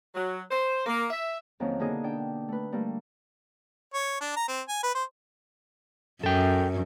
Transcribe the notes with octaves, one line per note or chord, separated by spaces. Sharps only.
F#3
C5
A#3
E5
F2 D#3 F#3 A#3 C#4
B2 D3 A#3 D#4 G#4
D4 G5
A3 B4
G3 A3 A#3
C#5
D4
A#5
C4
G#5
B4
C5
F#2 A4 G5